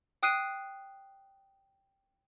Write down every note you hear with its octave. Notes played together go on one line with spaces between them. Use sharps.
G5 D#6 F#6 C7 D#7